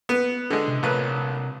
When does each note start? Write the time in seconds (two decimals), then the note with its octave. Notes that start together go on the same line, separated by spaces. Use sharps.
0.09 B3 B4
0.50 D3 G#3
0.68 C3
0.83 A#1 C3 A#4 B4 C#5